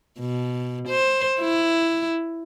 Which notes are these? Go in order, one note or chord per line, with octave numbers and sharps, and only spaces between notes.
B2
C5
E4